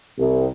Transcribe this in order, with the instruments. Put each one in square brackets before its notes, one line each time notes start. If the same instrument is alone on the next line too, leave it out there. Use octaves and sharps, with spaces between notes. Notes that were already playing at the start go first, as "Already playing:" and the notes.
[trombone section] C2